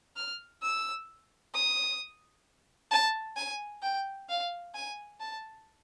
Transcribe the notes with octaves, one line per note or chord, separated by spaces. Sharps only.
F6
E6
D#6
A5
G#5
G5
F5
G#5
A5